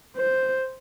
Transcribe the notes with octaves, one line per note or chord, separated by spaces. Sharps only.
C5